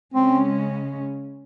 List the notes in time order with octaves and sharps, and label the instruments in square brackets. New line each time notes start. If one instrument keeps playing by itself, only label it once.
[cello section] C#3 G#3 C#4 [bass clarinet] C4